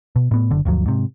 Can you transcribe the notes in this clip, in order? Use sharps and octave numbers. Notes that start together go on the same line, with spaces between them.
B2
A2 B3
F#1 D3
G1 D2 F3 F#3
G#2 C3